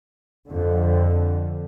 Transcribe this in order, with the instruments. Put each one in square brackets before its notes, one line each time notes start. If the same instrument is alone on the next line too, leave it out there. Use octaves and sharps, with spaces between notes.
[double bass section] F2 D3